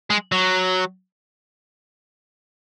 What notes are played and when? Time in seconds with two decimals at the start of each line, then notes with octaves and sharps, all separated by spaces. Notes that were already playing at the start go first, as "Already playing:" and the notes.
0.10 G#3
0.32 F#3